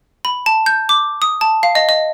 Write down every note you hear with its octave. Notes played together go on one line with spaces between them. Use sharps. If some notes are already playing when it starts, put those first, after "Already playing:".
B5
A5
G6
D6
D#6
A5
F5
D#5
D#5